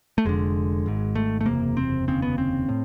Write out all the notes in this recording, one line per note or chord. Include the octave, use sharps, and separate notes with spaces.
A3
F1 F2 D3 G#3
G#1 G#2
A3
A3
F#1 E2 C3 A#3
C4
F1 D#2 C#3 C4
B3
C4
A2